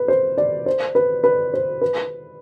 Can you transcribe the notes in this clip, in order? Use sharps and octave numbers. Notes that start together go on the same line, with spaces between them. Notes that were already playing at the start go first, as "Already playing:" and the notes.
Already playing: B4
C5
D5
C5
B4
B4
C5
B4